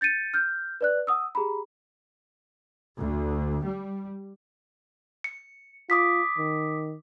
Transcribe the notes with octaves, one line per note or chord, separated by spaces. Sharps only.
G6 A6 C#7 D#7
F6 G6
B4 D5 F#6
F#5 D#6 E6
G4 G#4 A#5 B5
D2
G3
C#7
F4 D6 D#6 B6
D#3